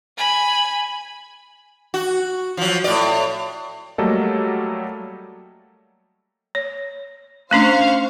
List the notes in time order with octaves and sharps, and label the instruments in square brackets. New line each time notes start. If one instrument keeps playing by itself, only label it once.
[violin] G#5 B5
[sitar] F#4
F3 F#3
A2 D5
[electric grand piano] F#3 G3 A3 A#3 A4 D#5
[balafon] C#5
[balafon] A3 C#4 D4 [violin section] C5 F5 C#6